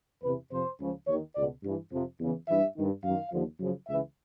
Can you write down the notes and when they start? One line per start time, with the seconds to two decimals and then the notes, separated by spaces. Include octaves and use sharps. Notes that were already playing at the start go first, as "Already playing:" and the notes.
0.23 E2 C3 E3 B4
0.52 F2 C3 F3 C5
0.80 C#2 C#3 F3
1.08 D#2 D#3 C#5
1.36 C#2 B2 D5
1.64 G2 E3
1.91 F2 C3 F3
2.20 E2 C#3 E3
2.48 G2 E3 E5
2.76 G2 D#3
3.03 F#2 D#3 F5
3.32 D#2 D3 F3
3.60 F#2 C#3 F3
3.88 C#2 C#3 E3 E5